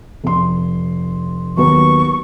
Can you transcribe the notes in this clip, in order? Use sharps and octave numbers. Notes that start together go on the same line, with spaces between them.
F1 C6
D#2 F#3 B3 C#6